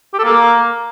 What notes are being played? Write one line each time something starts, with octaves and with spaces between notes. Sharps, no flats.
G4
A4
A#3